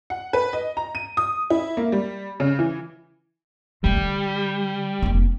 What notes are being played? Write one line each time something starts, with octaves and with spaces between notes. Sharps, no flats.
F#5
B4
D#5
A#5
D#7
D#6
E4
A#3
G3
C#3
E3
C3 G3 A3
D3
F1 A#3